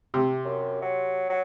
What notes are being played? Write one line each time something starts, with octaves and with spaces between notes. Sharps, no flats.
C3
F#2
F#3
F#3